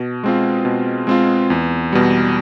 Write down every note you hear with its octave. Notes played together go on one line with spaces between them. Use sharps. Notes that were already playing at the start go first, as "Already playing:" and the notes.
Already playing: B2
G#3 C4 F4
B2
G#3 C4 F4
E2
B2 G3